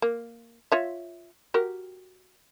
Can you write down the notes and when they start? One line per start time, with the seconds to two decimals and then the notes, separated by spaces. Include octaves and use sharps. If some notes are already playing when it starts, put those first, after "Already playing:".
0.02 A#3
0.72 F4 C#5 E5
1.54 F#4 G4 A#4